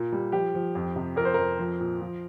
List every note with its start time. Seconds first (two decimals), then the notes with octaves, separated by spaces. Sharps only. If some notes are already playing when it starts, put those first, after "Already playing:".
Already playing: A#2
0.12 G3
0.32 F3 G4
0.54 F3
0.75 F2
0.96 C3
1.16 F2 A#4
1.25 C5
1.34 F2 A#4
1.59 F3
1.80 A#2
2.01 F3